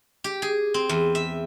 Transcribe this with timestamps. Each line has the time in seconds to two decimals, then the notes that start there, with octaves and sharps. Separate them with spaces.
0.24 G4
0.42 G#4
0.74 C4
0.89 E2
1.15 E5